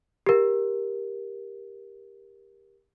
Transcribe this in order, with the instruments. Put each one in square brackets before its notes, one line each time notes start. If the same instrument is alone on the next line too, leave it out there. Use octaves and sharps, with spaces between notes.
[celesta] G4 A#4